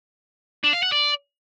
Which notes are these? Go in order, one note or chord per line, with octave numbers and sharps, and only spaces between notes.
D4
F5
F#5
D5